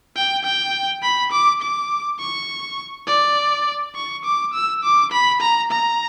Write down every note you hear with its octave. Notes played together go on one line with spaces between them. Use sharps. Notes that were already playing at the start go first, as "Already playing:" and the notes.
G5
G5
B5
D6
D6
C#6
D5
C#6
D6
E6
D6
B5
A#5
A#5